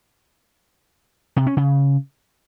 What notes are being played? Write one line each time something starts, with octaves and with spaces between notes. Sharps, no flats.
C3
C#4
C#3